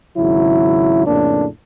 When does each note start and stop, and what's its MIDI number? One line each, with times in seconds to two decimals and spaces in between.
0.17 1.04 32
0.17 1.04 49
0.17 1.04 54
0.17 1.04 64
1.07 1.45 41
1.07 1.45 45
1.07 1.45 49
1.07 1.45 58
1.07 1.45 62